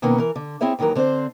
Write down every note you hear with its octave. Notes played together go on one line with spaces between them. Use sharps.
B2 D#3 A#3 B3 C#4
E3 A#4
D3
C4 E4 G#4 C#5 E5
D#2 D#3 E3 F#3 A#4
D3 C4 D4 G4 C5